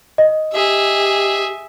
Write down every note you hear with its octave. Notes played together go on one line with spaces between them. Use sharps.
D#5
G4 G#4 E5